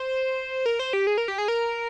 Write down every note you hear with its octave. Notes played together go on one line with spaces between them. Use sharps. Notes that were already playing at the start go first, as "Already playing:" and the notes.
Already playing: C5
A#4
C5
G4
G#4
A#4
G4
G#4
A#4